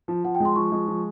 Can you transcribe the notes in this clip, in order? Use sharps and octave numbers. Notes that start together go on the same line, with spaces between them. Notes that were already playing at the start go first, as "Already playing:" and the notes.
F3
F3 F#5
G5
G#3 C6
F3 C#6
G#3
F3